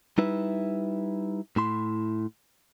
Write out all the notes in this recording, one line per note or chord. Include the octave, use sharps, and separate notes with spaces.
G3 D#4 E4 B4 E5
A2 E4 C6